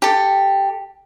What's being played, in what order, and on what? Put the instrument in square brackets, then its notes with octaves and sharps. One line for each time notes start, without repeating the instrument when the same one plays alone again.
[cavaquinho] G4 A4